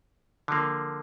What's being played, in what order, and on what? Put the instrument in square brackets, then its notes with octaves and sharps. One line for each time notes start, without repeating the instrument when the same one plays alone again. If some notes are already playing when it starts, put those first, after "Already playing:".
[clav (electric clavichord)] D3 F3 A#3